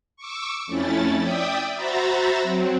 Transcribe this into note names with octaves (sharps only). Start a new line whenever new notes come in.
C#6 D6 E6
F2 A3 C#4 E4 A6
D5 E5 G5 D#6
F#4 C5 E5 A#5 B5 A6
F#3 C4